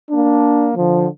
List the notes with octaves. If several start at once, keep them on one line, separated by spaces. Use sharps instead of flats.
A#3 D4
D3 F3